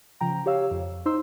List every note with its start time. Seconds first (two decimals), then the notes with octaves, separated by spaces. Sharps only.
0.21 C#3 F3 G5 A#5
0.46 G4 C#5 F5 E6
0.71 F2
1.06 D#4 C5 C6 E6